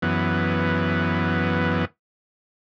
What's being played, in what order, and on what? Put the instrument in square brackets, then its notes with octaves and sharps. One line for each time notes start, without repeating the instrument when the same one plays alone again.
[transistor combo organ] F#2 E3 B3